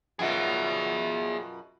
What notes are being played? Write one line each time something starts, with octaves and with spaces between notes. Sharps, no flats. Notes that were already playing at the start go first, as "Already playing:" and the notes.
F#2 B2 F4 G#4 E5